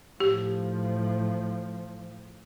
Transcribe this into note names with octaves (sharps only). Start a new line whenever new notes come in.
A2 F3 G4